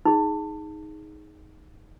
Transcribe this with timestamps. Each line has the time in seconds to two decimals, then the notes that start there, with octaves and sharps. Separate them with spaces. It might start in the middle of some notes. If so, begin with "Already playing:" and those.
0.05 D#4 G#4